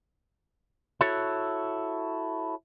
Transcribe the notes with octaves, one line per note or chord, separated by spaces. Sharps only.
E4 F#4 A4 C#5